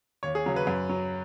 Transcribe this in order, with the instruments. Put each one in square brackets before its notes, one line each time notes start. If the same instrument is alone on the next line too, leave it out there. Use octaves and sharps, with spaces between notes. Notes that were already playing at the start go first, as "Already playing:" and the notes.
[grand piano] D#2 C#5
G#4
C#3 F#3
B4
F#2
F#3